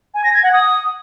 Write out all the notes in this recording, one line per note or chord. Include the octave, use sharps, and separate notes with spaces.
G#5
A#6
G#6
F#5
D#6